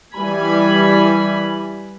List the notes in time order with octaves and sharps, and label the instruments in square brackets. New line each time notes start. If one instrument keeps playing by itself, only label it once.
[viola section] E3 G3 G#5 B5